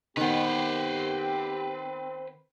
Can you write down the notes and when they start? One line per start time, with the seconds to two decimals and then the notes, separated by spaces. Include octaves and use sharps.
0.17 D#3 B3 C4 G4 B4 C5